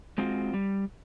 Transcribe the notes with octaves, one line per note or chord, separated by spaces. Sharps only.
G#3 C4 F4 F#4
G3